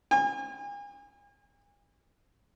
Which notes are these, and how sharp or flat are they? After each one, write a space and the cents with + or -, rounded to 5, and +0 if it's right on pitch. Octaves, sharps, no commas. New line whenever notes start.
G#5 -40